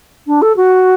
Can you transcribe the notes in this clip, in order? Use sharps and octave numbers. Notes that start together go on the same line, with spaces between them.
D4
A4
F#4